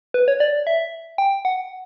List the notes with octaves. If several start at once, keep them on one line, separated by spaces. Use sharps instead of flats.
B4
C#5
D5
E5
G5
F#5